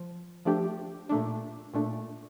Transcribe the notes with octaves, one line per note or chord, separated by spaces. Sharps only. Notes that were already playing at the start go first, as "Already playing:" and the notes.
Already playing: F3
F3 A3 D4 G4
A#2 A3 D4
A#2 A3 D4